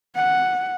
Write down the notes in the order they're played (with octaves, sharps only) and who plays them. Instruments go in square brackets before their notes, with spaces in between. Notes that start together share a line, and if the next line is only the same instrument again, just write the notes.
[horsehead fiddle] F#5